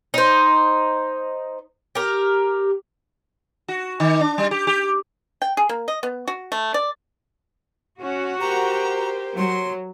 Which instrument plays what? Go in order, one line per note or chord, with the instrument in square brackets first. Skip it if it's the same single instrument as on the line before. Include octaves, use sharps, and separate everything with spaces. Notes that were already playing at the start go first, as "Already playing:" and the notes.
[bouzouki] D#4 C5
G4 A#4
[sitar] F#4
D#3
D4
G3
G4
G4
[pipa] G5
G#4
A#3
D#5
B3
F#4
A3
D5
[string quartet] C#4 [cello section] F#4
[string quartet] G4 A#4 C5 [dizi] A#5
[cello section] F#3 [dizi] C6